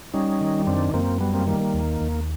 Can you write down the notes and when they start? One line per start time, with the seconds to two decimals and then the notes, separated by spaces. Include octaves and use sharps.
0.14 G3 C#4 D#4
0.41 D#3
0.67 F#2 C4 D4
0.94 F#2 A#3 C4
1.20 G3 B3
1.34 A#3 C4
1.47 D#3 A#3
1.60 A#3
1.74 D#2
2.01 D#2